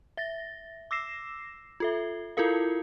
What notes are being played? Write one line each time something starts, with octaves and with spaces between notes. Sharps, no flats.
E5 A6 A#6
D6 E6 A#6 C7 E7
F4 A4 E5
E4 F4 A4 A#4 F5